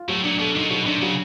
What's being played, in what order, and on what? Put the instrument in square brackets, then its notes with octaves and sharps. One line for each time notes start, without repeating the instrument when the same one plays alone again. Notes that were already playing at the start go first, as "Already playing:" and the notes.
Already playing: [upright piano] F4
[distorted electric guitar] A2 [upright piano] F#3
[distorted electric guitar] A#2 [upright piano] D4
[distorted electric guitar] B2 [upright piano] A3
[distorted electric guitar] A#2 [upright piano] D#3
[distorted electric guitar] B2 [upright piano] F#3
[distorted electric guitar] C3 [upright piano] D4
[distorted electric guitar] C#3 [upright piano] F#3